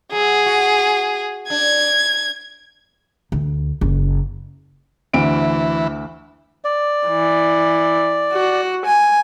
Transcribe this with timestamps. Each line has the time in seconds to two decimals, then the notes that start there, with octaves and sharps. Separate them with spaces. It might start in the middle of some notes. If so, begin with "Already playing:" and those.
0.12 F#3 G#4
0.46 F#4
1.50 D4 G#6
3.32 D2
3.81 F#1
5.14 D2 E3 D7
6.64 D5
7.08 E3
8.33 F#4
8.85 G#5